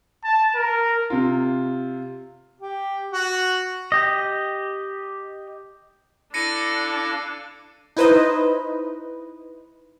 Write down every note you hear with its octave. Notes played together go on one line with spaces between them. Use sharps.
A5
A#4
C3 F4
G4
F#4
G4 D#5
D4 E4 A4 F5 A#6 C#7 D#7
D#4 E4 B4 C5 D#5